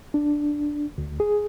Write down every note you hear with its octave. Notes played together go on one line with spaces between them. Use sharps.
D4
D2
G#4